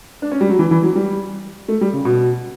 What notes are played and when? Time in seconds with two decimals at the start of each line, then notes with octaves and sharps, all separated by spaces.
0.22 D4
0.32 C#4
0.41 G3
0.49 F#3
0.59 E3
0.71 E3
0.83 F#3
0.95 G3
1.68 A3
1.81 G3
1.93 C#3
2.05 B2